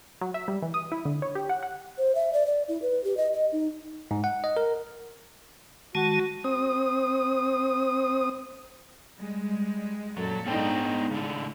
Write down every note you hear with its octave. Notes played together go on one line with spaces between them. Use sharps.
F#3
E5
G3
E3
D#6
E4
D3
C#5
G4
F#5
F#5
C5
E5
D5
D5
E4
B4
G4
D#5
D#5
D#4
G#2
F#5
D#5
A#4
D#3 G#3 F#4 A5
C4 D#6
G3 G#3
F#2 A#2 F#3 A4
G#2 B3 D4 D#4 C#5 G5
A2 C#3 D4